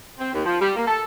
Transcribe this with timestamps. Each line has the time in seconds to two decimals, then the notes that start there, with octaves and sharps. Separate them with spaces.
0.19 C4
0.33 D#2
0.45 F3
0.61 G3
0.76 A#3
0.88 A4